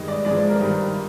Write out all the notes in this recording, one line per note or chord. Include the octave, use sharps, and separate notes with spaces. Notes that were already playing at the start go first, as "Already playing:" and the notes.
Already playing: G2 D#3 G#3 D#5
D5
G#2 F3 G#3 D5
C5
A#4
G2 D#3 G3